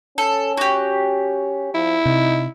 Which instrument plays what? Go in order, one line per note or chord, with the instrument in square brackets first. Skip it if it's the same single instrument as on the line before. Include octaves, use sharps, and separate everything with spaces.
[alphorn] C#4 [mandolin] A4
[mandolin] F#4 G4
[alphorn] F3 [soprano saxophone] E4
[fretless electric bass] C3 [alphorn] D#4